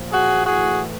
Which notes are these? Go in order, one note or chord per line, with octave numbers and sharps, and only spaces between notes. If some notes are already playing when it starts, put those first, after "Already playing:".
Already playing: A#2 F3
F#4 G#4
A2 E3 F#4 G#4